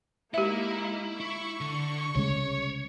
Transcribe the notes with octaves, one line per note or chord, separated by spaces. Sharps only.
G#3 A#3 D#4 E4 G4 E5
E4 C#6
D3
C2 C#3 G#3 C#5